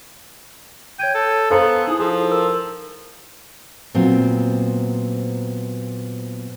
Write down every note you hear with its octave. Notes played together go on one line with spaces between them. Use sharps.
C#5 G5 G#6 D#7
A4
B3 A4 C5 F5 A#5 C#7
D#4 E4 G#4
F3 G#4
A#4 E6
A#2 F#3 B3 C4